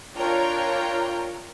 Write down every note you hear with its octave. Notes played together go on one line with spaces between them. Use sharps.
D4 F4 A#4 C#5 G5 A#5